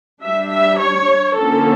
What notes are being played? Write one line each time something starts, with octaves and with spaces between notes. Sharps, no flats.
G3 D4 E5
E5
C#5
D3 F3 A#3 C#4 A4